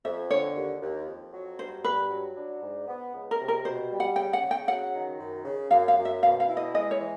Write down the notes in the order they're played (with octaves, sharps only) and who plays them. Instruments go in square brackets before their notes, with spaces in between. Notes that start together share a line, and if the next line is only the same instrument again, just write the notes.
[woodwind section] F2 [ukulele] E5
[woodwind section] D3 [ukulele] C#5
[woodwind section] D#2
D#2
F2
F#3
[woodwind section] G2 [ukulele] C5
[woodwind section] G2 [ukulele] B4
[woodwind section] F#3
D4
G#2
B3
C#2
[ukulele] A#4
[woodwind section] C3
[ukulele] A#4
[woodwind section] B2 [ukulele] C5
[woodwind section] G3
[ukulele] F#5
[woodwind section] C#3 [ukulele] G5
[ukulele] F#5
[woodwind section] C#3
[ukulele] G5
[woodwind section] F#3 [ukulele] F#5
[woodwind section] D#3
F#2
C#3
[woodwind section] F#2 [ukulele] F5
[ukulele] F5
[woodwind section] F#2
[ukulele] E5
[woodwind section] B2 [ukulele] F5
[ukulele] F5
[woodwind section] E4
[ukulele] D#5
[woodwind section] G#3 [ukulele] D#5
[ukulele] C#5
[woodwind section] E3